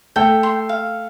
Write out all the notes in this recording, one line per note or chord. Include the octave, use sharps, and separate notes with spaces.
A3 A4 G5
C6
F5